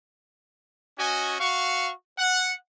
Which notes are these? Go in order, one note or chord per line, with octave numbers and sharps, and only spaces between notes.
C#4 F#4 D#5 G#5
F#4 F5 C#6
F#5